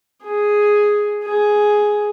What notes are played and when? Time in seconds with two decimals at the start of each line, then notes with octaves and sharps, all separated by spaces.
0.23 G#4
1.24 G#4